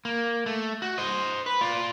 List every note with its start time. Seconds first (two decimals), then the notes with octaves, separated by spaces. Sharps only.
0.05 A#3
0.46 A3
0.82 F#4
0.98 C5 D#5
1.46 B4
1.61 F4 D5